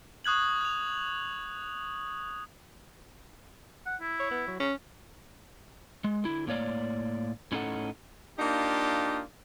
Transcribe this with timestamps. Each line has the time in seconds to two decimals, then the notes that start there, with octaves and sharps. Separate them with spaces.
0.25 C#6 D#6 F#6 G#6 F#7
0.61 F#6 F7
3.86 F#5
4.01 E4
4.20 C#5
4.31 B3
4.47 F#3
4.60 C#4
6.04 G#3
6.24 D3 E4
6.47 A2 A#3 C#5 D5
7.52 A2 C#4 D#4 F4 A4 F#5
8.39 A#3 D4 D#4 F4 G4